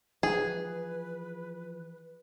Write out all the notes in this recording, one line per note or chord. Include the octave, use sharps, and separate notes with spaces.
E3 F3 G#4 B4